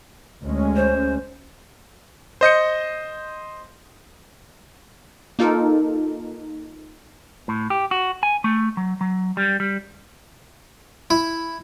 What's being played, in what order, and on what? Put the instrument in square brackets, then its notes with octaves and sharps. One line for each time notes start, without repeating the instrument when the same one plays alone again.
[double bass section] D2 G#3 C#4
[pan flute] C5
[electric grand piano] C5 D#5 G6 C#7
[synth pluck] A#3 D#4 F4 A4 A#4
[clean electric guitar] A2
G4
F#4
G#5
A3
F#3
F#3
G3
G3
[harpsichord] E4